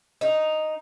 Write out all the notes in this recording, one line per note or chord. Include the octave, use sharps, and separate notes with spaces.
D#4